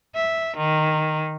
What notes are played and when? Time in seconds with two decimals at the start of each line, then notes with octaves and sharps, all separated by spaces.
0.15 E5
0.56 D#3